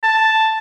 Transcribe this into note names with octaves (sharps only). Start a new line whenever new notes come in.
A5